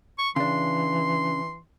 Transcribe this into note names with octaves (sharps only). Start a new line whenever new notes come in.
C#6
C#3 E3 D4 C6